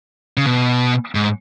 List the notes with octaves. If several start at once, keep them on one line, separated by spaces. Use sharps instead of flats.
C#3
B2
G#2